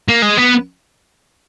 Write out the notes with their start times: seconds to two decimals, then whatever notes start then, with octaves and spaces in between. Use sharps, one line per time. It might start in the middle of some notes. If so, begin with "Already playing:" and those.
0.09 A#3
0.22 G#3
0.37 B3